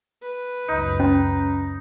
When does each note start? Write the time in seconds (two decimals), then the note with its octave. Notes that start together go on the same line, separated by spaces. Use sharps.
0.22 B4
0.68 C#2 F#2 D#4
1.00 C#4